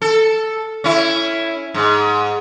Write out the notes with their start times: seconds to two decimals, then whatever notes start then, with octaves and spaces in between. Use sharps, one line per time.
0.02 A4
0.84 C#4 E4
1.74 G#2